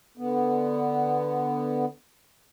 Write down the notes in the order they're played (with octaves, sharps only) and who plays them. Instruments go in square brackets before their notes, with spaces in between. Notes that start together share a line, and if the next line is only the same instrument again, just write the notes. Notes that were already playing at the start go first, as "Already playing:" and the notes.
[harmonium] D3 B3